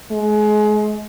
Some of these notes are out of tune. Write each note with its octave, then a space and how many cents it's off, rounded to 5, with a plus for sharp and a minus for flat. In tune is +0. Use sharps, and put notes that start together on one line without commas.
G#3 +30